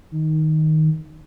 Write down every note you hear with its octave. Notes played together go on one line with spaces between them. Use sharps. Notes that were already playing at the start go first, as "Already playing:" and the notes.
D#3